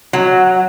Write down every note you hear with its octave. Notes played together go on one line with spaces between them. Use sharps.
F#3